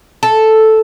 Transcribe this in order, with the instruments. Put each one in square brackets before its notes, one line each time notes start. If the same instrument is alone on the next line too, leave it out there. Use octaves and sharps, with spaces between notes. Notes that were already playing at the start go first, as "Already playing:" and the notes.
[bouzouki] A4